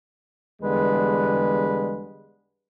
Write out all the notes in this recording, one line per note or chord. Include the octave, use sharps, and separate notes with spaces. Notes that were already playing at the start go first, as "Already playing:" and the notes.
E2 D3 G3 G#3 B4